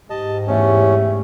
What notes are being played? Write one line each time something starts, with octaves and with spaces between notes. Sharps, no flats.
G#2 G4 D#5 A5
E2 A3 C#4 G4